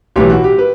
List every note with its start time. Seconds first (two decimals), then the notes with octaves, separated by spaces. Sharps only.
0.16 B1 A2 E3 G4
0.30 F#4
0.44 G4
0.58 B4